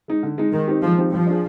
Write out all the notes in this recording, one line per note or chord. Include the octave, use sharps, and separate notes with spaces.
G#3 D#4
D3
G#3 D#4
D#3 G#3
C4 D#4 G4
F3 G#3
C4 D#4 G4
F3 G3
D4 G#4